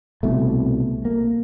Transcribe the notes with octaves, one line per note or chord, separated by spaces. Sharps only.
C2 B2 A3
A#3